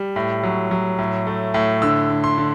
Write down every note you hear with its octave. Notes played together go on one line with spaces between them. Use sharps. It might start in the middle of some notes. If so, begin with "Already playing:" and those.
Already playing: G3
A2
F#3
F#3
A2
A3
A2
D3 E6
D3
C6
D3